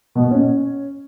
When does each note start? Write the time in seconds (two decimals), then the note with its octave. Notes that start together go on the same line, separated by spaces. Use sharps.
0.15 B2
0.23 A#2
0.31 C#4